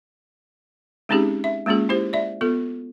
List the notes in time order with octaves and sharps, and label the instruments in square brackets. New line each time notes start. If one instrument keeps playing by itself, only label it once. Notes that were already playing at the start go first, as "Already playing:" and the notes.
[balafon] G#3 C4 C#4 D#4 G4 G#4
E5
G#3 A#3 C#4 F4 G#4
E4 G4 C5
D5 E5
B3 F4 A4